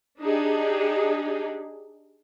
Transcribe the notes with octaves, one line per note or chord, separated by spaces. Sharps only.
D4 D#4 G4 G#4